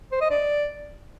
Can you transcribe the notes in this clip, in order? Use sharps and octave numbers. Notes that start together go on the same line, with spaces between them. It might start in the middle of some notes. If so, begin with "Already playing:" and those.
C5
D#5
D5